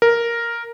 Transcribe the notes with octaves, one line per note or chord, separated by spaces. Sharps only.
A#4